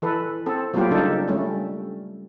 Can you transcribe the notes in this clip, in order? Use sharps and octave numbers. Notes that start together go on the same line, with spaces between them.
E3 A4 B4
C4 A4
F#3 G3 A3 A#3 F4 G4
C#3 D4 D#4 A4
G3 A3 C#4